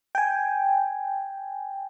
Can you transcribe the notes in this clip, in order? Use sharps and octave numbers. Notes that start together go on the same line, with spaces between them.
G5 G#5